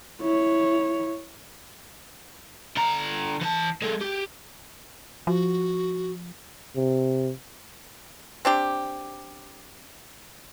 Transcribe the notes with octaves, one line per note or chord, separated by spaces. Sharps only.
E4 C#5
D3 A#5
E3 A5
G#3 A4
G4
F3 F#4
C3
C4 D4 G4